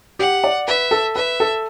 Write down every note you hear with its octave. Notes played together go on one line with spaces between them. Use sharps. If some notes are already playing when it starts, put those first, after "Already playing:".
G4 F#5
D5
B4 E5
A4
B4 E5
A4